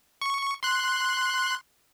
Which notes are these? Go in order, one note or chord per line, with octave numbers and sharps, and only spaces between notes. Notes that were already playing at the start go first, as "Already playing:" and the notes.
C#6
C6 F#6